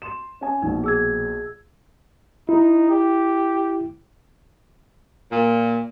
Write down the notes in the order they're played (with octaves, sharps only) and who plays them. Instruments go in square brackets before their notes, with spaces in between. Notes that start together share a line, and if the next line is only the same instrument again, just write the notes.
[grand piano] C6 E7
C#4 G#5
[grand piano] A#1 B2 [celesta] D#4
[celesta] G#4 E6 G#6
[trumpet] D#4 [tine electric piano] E4
[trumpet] G4
[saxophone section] A#2